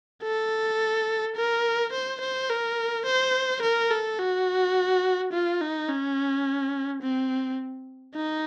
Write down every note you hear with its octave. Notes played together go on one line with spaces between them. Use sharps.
A4
A#4
C5
C5
A#4
C5
A#4
A4
F#4
F4
D#4
C#4
C4
D#4